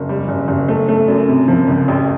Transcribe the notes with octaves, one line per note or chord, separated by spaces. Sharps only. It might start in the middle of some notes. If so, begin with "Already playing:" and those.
Already playing: F#1
G3
F#1
F#1
A3
A3
F#2
C3
F3
C#2
A1